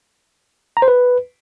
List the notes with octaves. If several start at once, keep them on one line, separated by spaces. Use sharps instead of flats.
A#5
C5
B4